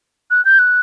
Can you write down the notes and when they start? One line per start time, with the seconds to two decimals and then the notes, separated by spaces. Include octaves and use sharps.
0.31 F#6
0.45 G6
0.59 F#6